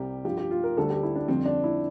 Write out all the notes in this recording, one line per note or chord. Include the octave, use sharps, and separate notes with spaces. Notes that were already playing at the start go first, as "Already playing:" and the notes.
Already playing: C2 C3 G3 G4
G2 F3 G4
G4
F4
A#4
D2 D3 G3 A4
G4
E4
D4
F2 D3 G3 C4
D4
E4